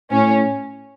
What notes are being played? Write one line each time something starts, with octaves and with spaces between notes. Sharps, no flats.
A2 C#4